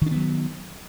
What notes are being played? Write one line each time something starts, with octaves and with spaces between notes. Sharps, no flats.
D#3 F#3 B3 D4